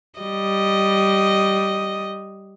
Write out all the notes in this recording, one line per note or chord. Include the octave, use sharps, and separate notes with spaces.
G3 D#5